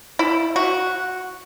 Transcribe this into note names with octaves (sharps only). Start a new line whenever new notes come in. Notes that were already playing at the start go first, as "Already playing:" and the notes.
E4
F#4